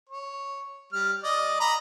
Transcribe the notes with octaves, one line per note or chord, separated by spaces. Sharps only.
C#5
G3 F6
D5 D#5
D#5 A#5 B5